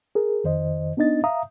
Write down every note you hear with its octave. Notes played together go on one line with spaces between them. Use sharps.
G#4 A#4
F2 D#3 C5 D#5
B3 D4 D#4 D#5 A6
E5 F5 A#5 D#6